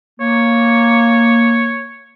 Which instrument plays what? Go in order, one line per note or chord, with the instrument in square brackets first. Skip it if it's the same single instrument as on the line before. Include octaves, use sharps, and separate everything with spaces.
[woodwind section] A#3 [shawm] C#5